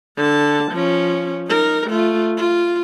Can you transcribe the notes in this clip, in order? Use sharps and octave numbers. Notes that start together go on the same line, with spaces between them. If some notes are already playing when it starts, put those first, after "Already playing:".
D3 A5
F3 C#4
D#4 A#4
A3 F4
F4